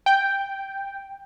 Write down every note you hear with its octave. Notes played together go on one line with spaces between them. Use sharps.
G5